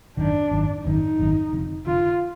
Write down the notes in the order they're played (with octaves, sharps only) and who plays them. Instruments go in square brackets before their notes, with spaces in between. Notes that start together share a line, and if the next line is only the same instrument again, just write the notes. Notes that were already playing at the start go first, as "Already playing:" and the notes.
[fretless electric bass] G#1 F#2 D#3 [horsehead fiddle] D4
[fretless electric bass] G#1 F#2 D#3
[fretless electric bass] G#1 F#2 D#3 [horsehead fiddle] D#4
[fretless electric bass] G#1 F#2 D#3
F1 F2 D3
[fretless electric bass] F1 F2 D3 [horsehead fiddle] F4